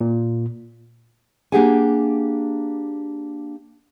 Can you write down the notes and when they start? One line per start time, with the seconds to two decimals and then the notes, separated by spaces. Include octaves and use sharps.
0.01 A#2
1.52 A#3 D4 G4 G#4 F#5 G#5